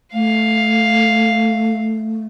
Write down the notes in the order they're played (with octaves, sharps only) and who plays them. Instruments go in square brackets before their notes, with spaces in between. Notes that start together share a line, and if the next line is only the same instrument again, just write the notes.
[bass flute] A3 [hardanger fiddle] F5